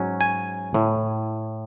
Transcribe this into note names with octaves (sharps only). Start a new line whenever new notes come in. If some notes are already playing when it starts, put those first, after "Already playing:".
Already playing: G#2 F#3 C#4
G#5
A2